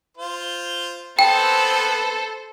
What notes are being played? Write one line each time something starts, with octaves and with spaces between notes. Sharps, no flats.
F4 C5
B3 C4 A4 B4 C5 G5